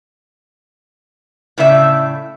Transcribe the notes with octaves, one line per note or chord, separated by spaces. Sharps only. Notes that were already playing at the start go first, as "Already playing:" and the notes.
A2 C#3 D5 E5